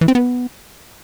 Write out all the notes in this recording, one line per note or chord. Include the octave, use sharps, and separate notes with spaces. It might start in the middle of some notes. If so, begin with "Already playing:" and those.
E3
C4
B3